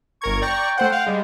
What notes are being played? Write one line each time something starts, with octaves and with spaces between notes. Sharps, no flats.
G1 A#4 C#6 G#6
D5 G5 A#5 C#6
A3 C5 F#5
F5 F#5
G3 G#3